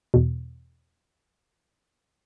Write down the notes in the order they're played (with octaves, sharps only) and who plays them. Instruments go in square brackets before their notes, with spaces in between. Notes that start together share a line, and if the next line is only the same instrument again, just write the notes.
[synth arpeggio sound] E2 B2